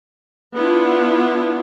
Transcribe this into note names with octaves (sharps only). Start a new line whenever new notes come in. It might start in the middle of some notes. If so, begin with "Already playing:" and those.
B3 D4 E4 F4